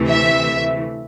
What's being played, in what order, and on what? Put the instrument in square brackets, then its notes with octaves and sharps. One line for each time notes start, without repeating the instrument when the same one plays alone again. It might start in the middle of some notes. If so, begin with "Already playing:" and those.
Already playing: [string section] D2 C3 E3 A3
[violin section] E5